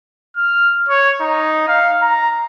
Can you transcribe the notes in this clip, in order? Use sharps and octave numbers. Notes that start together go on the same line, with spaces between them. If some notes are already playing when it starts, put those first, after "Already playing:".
F6
C#5
D#4
F5
A#5